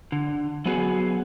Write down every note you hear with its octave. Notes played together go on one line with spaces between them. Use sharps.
D3
F#3 B3 C#4 F#4 G#4